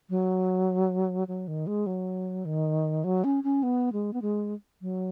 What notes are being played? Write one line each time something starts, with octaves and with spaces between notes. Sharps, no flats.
F#3
F#3
D#3
G#3
F#3
D#3
F#3
C#4
C#4
B3
G#3
B3
G#3
F#3